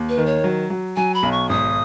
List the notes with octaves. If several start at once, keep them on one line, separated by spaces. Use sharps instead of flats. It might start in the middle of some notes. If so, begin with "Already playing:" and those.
Already playing: D#2
B4
D#3
C#5
F#3
F#3
F#3 G#5
B5
B1
C#6
G#1 D#6